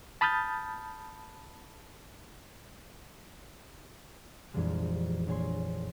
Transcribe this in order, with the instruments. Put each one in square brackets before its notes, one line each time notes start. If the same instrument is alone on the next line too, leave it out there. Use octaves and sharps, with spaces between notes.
[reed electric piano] A5 B5 D#6 F6 G6 A6
[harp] A#1 F2 E3 G3 G#3
A#1 C#5 G#5 C6